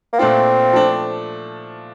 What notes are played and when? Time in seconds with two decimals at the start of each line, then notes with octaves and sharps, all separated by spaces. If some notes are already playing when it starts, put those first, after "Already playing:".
0.13 A#3
0.19 A#2 A3 C4 D4 F4
0.73 F3 A3 D4